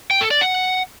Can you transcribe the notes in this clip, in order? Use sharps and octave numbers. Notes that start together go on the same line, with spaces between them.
G5
A4
D5
F#5